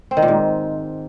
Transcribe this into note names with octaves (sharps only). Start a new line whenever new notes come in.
C4
D#3
A#2
G#2